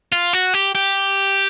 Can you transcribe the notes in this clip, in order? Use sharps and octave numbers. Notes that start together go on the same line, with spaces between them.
F4
F#4
G4
G4